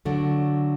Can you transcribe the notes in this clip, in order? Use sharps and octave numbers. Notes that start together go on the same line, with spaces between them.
D3 F#3 A3